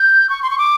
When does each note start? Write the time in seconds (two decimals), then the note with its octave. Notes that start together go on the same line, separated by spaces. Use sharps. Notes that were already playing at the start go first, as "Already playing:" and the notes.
Already playing: G6
0.30 C#6
0.42 C6
0.50 C#6
0.58 D6